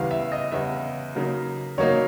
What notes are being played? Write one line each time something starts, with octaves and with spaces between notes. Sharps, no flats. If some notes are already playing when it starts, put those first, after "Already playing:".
Already playing: E2 C#3 E3 G3 F5
E5
D#5
E2 C#3 E3 G3 E5
C#3 F#3 A#3 D#4
C#3 F#3 A#3 D#4 C#5